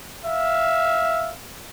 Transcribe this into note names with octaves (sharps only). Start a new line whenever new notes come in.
E5 F5